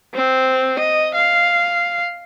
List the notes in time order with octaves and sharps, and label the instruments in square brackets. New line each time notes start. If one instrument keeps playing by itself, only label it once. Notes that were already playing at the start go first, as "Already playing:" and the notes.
[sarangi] C4
D#5
F5